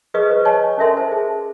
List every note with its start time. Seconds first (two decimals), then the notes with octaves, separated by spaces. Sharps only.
0.14 G#4 B4 D#5 C#6 D#6
0.27 B4 C5
0.45 C#5 D#5 G#5 A5 C#6
0.78 C#4 A4 A#4 E5 A5 C6
0.97 C5 A5
1.12 G#4